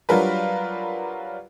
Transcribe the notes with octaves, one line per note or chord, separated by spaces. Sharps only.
F#3 G3 D4 F4 A#4 B4